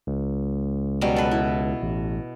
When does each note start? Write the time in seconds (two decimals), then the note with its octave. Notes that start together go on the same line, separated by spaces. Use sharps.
0.07 C#2
1.01 B2 F#3 G3
1.16 A4 B4
1.31 E4
1.82 A1